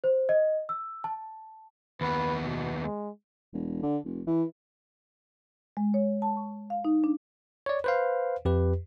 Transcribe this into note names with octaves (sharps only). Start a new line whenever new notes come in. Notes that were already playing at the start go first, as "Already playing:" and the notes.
C5
D#5
E6
A5
D#2 B3 B4
B2
G#3
E1
D3
F1
E3
G#3
C#5
A5
C#6
F5
D#4
D4
C#5 D5
B4 C5 F5
F2 G4 B4